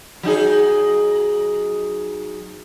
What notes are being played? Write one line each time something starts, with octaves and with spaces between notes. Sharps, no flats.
F#3 D#4 G#4